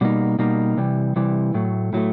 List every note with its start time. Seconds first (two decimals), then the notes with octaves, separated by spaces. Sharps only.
0.01 B2 G3 A#3 D#4
0.39 B2 G3 A#3 D#4
0.77 C3 E3 G3
1.16 C3 E3 G3
1.54 A2 F#3 A3
1.93 A2 F#3 A3